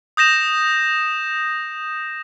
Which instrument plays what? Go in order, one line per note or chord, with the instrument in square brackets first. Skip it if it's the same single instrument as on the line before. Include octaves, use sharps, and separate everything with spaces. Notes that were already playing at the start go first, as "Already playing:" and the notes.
[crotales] D#6 G6 A#6 E7